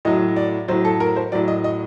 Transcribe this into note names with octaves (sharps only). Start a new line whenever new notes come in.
A2 F#3 D#5
D5
A2 F#3 C5
A4
A#4
C5
A2 F#3 D5
D#5
D#5